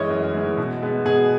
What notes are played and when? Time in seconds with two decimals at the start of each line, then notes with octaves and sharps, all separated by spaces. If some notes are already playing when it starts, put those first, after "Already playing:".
Already playing: F#2 E3 G#3 C#5 D#5
0.10 F#2
0.34 E3 G#3
0.58 B2
0.82 G#3 B3
1.05 B2 G#4